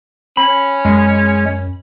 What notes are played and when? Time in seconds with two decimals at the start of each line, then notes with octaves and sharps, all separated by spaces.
0.37 C#4 B5
0.85 F#2 G#3